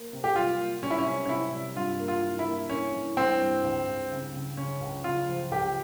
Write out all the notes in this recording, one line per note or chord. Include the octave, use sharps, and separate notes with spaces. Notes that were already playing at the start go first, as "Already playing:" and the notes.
Already playing: A#3
C3
G4
G3 F4
A#3
G3 C#4
E4
C#4
C3
C#4
C3 E4
G3
G2 F4
A#3
F4
E3
E4
A#3
A#3 C#4
E3
G2 C4
G2
C#2
C#2
C#3
C#3
C#3 C#4
C#2
C#3 F4
F3
C#2 G4